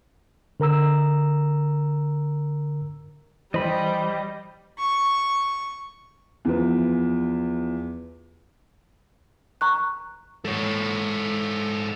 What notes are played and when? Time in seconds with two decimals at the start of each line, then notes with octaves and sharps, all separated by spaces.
0.60 D3 A#4 A#5 E6
3.54 E3 G3 C5 D#5 B5
4.79 C#6
6.45 E2 F3 B4
9.61 A#5 C#6 F#6
10.45 G#2 F#4 A4 C#5